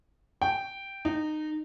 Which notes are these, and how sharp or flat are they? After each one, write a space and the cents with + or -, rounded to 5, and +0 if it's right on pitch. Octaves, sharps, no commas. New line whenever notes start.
G5 -5
D#4 -20